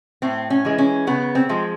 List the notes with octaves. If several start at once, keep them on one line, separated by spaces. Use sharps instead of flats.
A2 C4
C#4
E3 G#3
C#4
C#3 B3
C4
F3 G#3